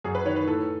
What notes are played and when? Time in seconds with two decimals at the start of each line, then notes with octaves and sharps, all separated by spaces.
0.04 F#2 G#4
0.15 B4
0.26 D#3 C#5
0.36 B4
0.47 A2 A4